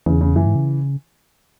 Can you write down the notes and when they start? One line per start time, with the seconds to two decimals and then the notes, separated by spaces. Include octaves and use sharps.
0.06 E2 C#3
0.21 C#3
0.36 F#2 E3
0.46 G#2
0.55 C#3